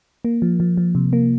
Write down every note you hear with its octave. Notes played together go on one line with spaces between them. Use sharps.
A#3
F3
F3
F3
C3
A#3